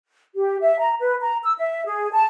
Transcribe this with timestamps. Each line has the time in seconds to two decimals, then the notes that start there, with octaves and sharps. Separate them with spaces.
0.36 G4
0.61 E5
0.80 A#5
1.00 B4
1.22 A#5
1.44 E6
1.58 E5
1.86 G#4
2.12 A5